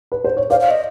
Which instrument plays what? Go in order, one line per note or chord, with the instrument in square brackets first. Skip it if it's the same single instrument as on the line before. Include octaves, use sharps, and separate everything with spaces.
[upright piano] B4
C5
C#5
[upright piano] C5 D5 [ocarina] F5
[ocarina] F5
D#5